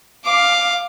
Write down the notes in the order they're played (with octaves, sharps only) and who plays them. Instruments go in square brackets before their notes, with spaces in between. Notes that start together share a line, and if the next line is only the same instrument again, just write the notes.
[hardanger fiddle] F5 D6